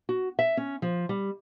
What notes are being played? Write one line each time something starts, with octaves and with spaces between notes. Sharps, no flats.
F#4
E5
C#4
F3
G3